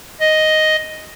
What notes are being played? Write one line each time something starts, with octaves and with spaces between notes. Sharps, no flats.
D#5